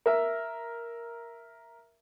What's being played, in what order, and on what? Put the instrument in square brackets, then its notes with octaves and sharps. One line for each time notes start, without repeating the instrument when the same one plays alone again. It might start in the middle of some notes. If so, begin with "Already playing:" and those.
[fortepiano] A#4 E5